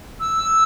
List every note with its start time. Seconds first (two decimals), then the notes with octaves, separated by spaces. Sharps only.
0.20 E6